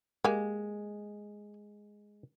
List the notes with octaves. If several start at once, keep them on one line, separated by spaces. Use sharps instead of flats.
G#3 A#3 G4 G#5